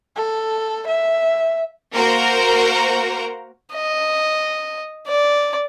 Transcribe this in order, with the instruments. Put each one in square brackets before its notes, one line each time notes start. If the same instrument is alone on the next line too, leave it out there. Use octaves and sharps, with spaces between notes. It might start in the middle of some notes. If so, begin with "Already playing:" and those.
[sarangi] A4
E5
[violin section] A#3 F#4 A#4 C5 A#5
[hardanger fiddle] D#5
D5